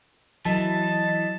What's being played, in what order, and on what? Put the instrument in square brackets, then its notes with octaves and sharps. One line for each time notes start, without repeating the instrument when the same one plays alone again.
[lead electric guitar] E3 [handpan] F#3 [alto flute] D#5 [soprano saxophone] A5